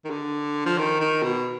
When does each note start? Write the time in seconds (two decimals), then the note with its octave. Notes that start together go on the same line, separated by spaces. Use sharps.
0.05 D#3
0.10 D3
0.66 F3
0.78 D#3
1.00 D#3
1.23 B2